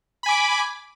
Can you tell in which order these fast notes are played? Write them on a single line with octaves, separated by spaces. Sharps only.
B5 G#5 D6